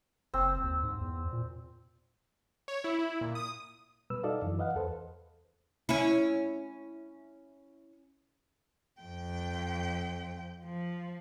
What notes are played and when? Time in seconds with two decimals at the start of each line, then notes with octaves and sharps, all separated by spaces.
0.34 F#1 C4
0.63 D#2
0.83 G#2
1.01 E2
1.33 A#2
2.68 C#5
2.84 E4
2.99 E4
3.21 A#2
3.35 D#6
4.10 B2 G3 B4 E6
4.23 D#4 F#4 A4 D5 D#5 F5
4.42 F#2 E3
4.58 B4 D#5 F5 F#5
4.75 E2 A4 B4 C5
5.89 C#4 E4
9.01 F2 G5
10.65 F3